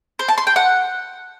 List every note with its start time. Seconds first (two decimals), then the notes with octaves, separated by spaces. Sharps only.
0.19 C5
0.28 A5
0.38 C6
0.47 G5
0.56 F#5